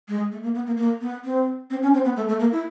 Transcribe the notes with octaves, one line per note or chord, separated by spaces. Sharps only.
G#3
A3
A#3
B3
A#3
A#3
B3
C4
C4
C#4
C4
B3
A3
A3
A#3
E4